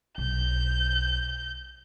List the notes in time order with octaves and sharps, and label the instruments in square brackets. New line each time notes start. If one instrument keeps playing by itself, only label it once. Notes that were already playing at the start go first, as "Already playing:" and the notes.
[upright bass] B1 [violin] G6